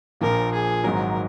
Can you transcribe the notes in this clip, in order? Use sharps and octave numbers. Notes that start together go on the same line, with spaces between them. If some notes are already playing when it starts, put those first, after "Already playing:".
A#1 A#2 F3 A#3 A#4
G#4
G#1 G#2 F#3 A#4